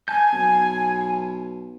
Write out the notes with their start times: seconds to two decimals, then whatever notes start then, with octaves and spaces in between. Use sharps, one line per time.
0.08 G#5 A5 G6
0.32 B1